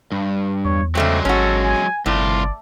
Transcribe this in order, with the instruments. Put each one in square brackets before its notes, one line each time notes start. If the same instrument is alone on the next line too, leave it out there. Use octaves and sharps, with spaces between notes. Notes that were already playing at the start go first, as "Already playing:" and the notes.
[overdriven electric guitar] G2
[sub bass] E2 [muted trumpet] C#5
[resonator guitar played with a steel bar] C#3 A3 C4 [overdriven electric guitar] F#3 G#3 [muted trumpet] D5
[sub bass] G#1 [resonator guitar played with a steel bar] C#4 F#4 [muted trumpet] A4
[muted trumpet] G#5
[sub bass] G1 [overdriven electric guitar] C2 F4 [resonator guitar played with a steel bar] A2 [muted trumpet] D5